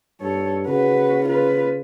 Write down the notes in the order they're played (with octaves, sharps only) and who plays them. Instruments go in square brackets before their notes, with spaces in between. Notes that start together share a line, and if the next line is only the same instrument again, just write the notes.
[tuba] G2 [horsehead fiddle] A4 C#5
[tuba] C#3 [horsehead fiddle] F#4 B4
[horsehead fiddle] F4 B4